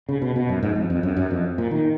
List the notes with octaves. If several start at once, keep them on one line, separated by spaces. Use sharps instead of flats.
C#3
B2
B2
F#2
G#2
F2
F2
F#2
F#2
F2
A#2
D#3